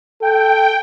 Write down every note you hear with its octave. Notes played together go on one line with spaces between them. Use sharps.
A4 G5